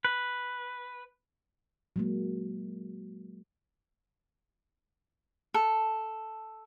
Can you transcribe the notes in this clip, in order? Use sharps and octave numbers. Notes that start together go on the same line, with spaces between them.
B4
F#3 G#3 A#3
A4